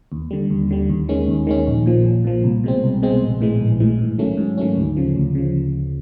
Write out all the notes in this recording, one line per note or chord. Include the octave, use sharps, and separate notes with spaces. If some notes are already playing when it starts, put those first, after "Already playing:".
D#2
D3 G3
D#2
D3 G3
D#2
D#3 G#3 C#4
D#2
D#3 G#3 C#4
A#1
A#2 F3
A#1
A#2 F3
C2
B2 G#3 C4
C2
B2 G#3 C4
A#1
A2 E3 G#3
A#1
A2 E3 G#3
G#2
D#3 F#3 A3 C#4
G#2
D#3 F#3 A3 C#4
D2
C#3 F3
D2
C#3 F3